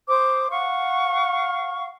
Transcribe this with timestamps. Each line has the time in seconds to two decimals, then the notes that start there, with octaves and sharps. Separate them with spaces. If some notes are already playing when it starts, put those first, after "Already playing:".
0.07 C5 D6 D#6
0.51 F5 F#5 C#6